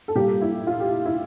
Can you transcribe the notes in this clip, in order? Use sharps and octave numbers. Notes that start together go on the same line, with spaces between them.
A4
A#2 G3 A#3 G4
E4
F4
G4
E4